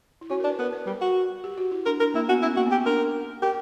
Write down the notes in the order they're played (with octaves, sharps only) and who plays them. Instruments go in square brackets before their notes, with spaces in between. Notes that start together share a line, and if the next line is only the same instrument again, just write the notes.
[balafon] E4
[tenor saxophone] C#4 [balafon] F#4
[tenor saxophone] D4 [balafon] A#4
[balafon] B4
[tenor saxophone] B3 [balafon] A#4
[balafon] B4
[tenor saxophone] G3 [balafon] A#4
[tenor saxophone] F#4
[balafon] G4
F#4
E4
[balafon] D4 [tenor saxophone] A#4
[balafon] D4 [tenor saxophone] A#4
[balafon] A#3 [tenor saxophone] E4
[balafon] B3 [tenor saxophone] F#4
[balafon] C#4 [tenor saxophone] E4
[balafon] A#3 [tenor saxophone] F#4
[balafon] B3 [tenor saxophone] G4
[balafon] D4 [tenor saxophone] A#4
[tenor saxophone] G4 [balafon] A#4